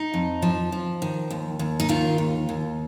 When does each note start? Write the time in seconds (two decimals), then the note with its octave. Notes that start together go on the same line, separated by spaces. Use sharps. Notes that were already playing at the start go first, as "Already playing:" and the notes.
Already playing: D#4
0.14 F2
0.42 F3
0.72 F3
1.02 D#3
1.30 D#2
1.59 D#2
1.80 D#4
1.89 D#3 F4
2.18 D#2
2.49 D#2